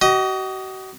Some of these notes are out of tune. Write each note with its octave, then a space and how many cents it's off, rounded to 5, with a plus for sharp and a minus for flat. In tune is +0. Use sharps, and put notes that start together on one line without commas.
F#4 +40 D#5 +0